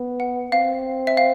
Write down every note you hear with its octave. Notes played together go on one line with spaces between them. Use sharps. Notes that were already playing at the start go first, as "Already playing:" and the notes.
Already playing: B3
F#5
C4 F5
E5
F5